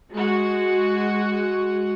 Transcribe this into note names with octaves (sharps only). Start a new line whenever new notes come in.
G#3 F#4